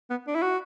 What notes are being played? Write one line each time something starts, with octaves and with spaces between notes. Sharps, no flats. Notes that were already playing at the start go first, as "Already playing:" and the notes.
B3
D4
E4
F#4